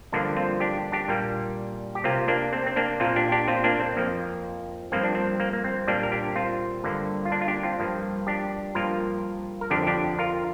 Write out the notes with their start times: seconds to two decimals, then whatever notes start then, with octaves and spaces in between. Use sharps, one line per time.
0.13 G2 D3 F3 A#3 D4
0.36 C4 F4
0.60 D4 G4
0.92 D4 G4
1.08 A#2 G3 A#3
1.95 G4
2.04 C3 A#3 C4 F4
2.28 A#3 D4
2.53 C4
2.66 C4
2.76 A#3 D4
3.00 A#2 A#3 C4 F4
3.16 D4 G4
3.32 D4 G4
3.48 C4 F4
3.64 A#3 D4
3.80 C4
3.97 F2 F3 A#3
4.92 G2 F3 A#3 C4
5.04 D4
5.15 C4
5.40 A#3
5.53 A#3
5.64 C4
5.87 A#2 G3 A#3 D4
6.03 A#4
6.12 D4 G4
6.36 C4 F4
6.84 G2 D3 A#3
7.25 F4
7.32 A#3 D4
7.41 F4
7.48 D4 G4
7.63 C4 F4
7.80 G2 F3 A#3
8.27 D4 G4
8.75 G2 F3 A#3 F4 A#4
9.61 A#4
9.70 F2 D3 F3 D4 G4
9.87 D4 G4
10.19 F4 A#4